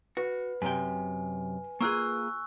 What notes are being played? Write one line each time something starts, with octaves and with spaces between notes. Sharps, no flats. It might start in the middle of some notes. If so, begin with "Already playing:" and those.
F#4 B4
F#2 C3 G5 G#5
A#3 F4 G#4 C#6 E6 F#6